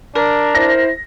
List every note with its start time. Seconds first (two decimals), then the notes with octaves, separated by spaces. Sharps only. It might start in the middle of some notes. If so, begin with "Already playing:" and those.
0.15 D4 A#4
0.55 E4 C5 A#6